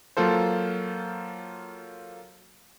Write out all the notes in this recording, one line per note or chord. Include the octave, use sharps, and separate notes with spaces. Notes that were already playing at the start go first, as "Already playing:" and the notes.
F#3 A#3 F4 A4 C5